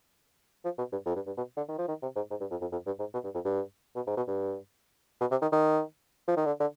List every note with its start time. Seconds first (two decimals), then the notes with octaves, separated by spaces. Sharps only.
0.65 F3
0.78 B2
0.92 G2
1.06 F2
1.16 G2
1.27 G2
1.37 B2
1.57 D3
1.69 D#3
1.78 F3
1.88 D#3
2.02 C3
2.16 G#2
2.30 G#2
2.41 G2
2.51 F2
2.61 F2
2.72 F2
2.86 G2
2.99 G#2
3.14 B2
3.24 G2
3.34 F2
3.45 G2
3.96 B2
4.07 G#2
4.17 B2
4.28 G2
5.21 B2
5.31 C3
5.42 D#3
5.52 D#3
6.28 F3
6.37 D#3
6.46 D3
6.60 D3